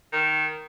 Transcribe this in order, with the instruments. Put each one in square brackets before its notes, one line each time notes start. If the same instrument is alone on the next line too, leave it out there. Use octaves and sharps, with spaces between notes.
[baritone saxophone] D#3